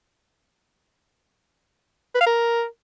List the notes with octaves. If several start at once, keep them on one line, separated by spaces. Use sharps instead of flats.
B4
F5
A#4